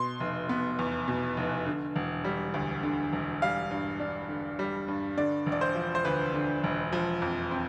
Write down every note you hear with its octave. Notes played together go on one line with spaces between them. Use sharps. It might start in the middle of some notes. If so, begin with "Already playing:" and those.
Already playing: B2 C6
F1
B3
E2
B2
F1
D3
E1
G3
D2
D3
E1
G3 F5
G2
D4
D3
G3
G2
D3 D5
E1
D5
C5
F3
C5
D2 B4
D3
E1
F3
F2
C4